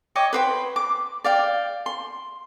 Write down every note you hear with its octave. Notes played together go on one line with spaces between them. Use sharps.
C#5 D#5 G5 D6
B4 C5 G5
D6
D5 F5 G5
C6